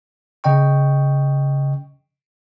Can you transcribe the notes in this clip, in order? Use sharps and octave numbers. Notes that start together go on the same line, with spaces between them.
C#3 D#5 G5 C#6